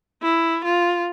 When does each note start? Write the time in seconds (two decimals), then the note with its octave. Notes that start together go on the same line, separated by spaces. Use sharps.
0.22 E4
0.65 F4